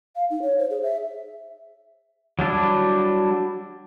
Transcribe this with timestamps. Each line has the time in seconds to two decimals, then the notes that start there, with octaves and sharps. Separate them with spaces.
0.16 F5
0.30 D#4
0.42 C#5
0.58 C5
0.70 G#4
0.83 E5
2.39 F#3 G3 D4 E4